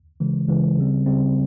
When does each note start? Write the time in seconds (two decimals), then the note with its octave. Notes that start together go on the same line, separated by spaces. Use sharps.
0.20 C#3 E3 G#3
0.48 C#3 E3 G#3
0.77 C#3 G3 C4
1.06 C#3 G3 C4